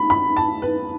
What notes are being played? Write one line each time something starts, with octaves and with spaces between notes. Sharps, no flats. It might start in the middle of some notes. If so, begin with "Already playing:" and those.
Already playing: B5
B5
A5
B4